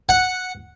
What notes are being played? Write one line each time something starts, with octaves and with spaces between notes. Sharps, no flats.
F#5